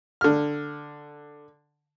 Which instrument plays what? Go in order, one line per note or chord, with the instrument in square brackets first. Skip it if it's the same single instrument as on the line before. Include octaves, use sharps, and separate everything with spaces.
[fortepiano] D3 F6